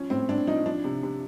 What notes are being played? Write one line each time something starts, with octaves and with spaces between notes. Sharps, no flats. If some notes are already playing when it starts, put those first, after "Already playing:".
Already playing: F3 C#4
A2 C4
A2 D4
F3 D#4
F3 D4
C3
C3